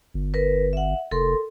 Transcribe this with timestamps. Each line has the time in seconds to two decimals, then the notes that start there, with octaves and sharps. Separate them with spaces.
0.14 G1
0.34 A#4 B4
0.73 E5 F#5
1.11 F1 A4 A#4 C6